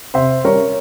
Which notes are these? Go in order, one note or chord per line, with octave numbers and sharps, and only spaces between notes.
C3 C5 E5
G3 C#4 A#4 C#5